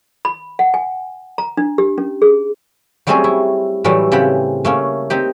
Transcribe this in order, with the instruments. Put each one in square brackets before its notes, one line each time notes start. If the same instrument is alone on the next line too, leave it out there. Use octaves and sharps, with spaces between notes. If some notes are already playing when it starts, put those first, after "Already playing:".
[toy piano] B5
F#5
G#5
A#5
D4
G4
C#4
G#4
[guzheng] F#3 G3 A3 C4 C#4 G#4
E4
A2 E3 F#3 G3 A3
C#3 C4 G4 F#5 B5
A3 A#3 C#4
C4 D#4 G4